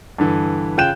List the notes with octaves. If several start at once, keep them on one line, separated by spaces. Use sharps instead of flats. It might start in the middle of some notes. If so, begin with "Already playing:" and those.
G2 D3 E3
C#3 F4 G5 F#6 G6 E7